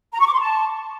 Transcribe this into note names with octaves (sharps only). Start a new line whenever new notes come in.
A#5
C#6
D6
C6
A5